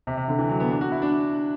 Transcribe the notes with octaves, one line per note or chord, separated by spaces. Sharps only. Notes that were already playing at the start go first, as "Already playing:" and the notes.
C3
C3
D3
E3
F#3
B3
D4
F#4
E4
D4